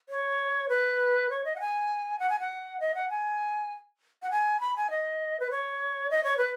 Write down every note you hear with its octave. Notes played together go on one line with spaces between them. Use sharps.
C#5
B4
C#5
D#5
F#5
G#5
F#5
G#5
F#5
D#5
F#5
G#5
F#5
G#5
B5
G#5
D#5
B4
C#5
D#5
C#5
B4